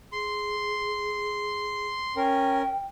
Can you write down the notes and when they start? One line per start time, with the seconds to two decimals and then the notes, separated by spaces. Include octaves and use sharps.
0.12 G#4 C6
2.16 C#4 A#4 G5